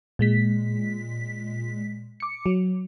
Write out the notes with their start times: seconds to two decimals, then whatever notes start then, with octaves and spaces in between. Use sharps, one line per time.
0.19 A#2 G#3 B6
2.20 D6 C#7
2.46 F#3